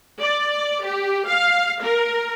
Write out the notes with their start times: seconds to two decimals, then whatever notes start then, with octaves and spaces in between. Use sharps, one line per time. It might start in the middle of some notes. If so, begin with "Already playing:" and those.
0.22 D5
0.84 G4
1.28 F5
1.83 A#4